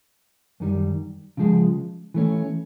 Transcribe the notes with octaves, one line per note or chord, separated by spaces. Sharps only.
F#2 D#3 G3
C#3 F3 G#3
E3 A3 C#4